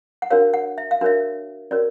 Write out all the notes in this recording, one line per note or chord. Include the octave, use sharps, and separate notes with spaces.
F#5
D4 F#4 A#4 C#5 F5
F#5
E5
F5
D4 F#4 A#4 C#5 E5
C#4 F#4 A#4 C#5 D5